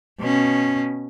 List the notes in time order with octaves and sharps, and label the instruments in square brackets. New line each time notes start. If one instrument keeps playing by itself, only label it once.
[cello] B2 C#4